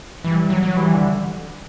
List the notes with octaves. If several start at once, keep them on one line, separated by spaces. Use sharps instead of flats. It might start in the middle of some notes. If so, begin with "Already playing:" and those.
E3 G3
F#3
F#3
E3 G3
D3